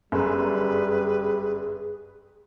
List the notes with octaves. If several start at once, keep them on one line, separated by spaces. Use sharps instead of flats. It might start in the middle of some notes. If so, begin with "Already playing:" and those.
G1 F#2 G3 G#4 B4